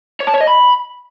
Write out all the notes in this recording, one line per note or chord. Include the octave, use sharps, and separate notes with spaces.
C#5
A5
C#5
D#5
B5